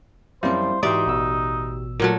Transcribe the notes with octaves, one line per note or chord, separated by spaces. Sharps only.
F#2 F3 G3 C4 E4 C5 F5
G#2 E3 D#4 F#4 G4 D5 E5 C6
A1 B2 E6
A#2 F#3 A3 A#4